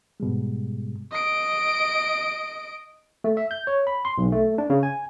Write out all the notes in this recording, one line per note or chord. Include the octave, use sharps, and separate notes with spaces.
G#2 B2 G3 G#3
D#5 D7
A3
E5
G6
C#5
B5
C6
B1
A3
D4
C#3
G#5